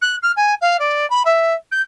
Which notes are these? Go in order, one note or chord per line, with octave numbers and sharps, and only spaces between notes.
F#6
F6
G#5
F5
D5
B5
E5
G6